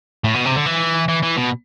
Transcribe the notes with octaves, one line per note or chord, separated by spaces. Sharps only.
A2
B2
C3
D3
E3
E3
E3
B2